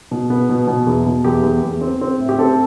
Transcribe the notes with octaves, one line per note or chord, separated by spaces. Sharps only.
B2
B3
B2
B2
E2
B2
E2 G4
E2
E2
C4
C4
A2
G4
C4 A4